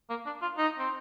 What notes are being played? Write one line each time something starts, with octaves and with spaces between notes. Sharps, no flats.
A#3
D4
F4
D#4
C4